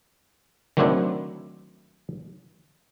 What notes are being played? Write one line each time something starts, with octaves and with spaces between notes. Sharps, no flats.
D#3 F#3 A3 C4 D4 E4